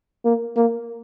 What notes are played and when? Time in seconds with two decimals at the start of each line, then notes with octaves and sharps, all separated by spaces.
0.25 A#3
0.57 A#3